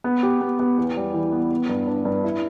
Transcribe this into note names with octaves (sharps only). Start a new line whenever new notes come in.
B3
G4
B3
B3
E2
G3
E3
B3
B3
G2
D4
G2
E4